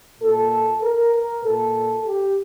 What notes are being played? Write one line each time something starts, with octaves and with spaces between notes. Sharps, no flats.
A#2 A4
A#4
A#4
A#2 A4
G4